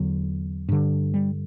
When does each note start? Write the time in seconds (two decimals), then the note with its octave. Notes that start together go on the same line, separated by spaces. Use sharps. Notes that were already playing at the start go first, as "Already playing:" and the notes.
Already playing: E2 D3 F#3
0.69 G2 D3
1.14 G3